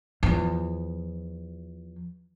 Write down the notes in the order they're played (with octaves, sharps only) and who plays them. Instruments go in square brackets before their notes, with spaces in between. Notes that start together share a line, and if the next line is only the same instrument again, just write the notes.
[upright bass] E2 F3